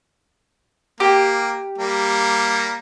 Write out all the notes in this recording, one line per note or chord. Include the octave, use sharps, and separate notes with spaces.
A#3 G4
G3 A#3